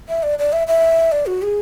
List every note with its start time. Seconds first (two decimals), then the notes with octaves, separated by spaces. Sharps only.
0.09 E5
0.23 D5
0.39 D5
0.53 E5
0.68 E5
1.12 D5
1.26 F#4
1.42 G#4